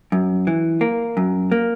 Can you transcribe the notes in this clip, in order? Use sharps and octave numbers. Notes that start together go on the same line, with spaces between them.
F#2
E3
A#3
F#2
A#3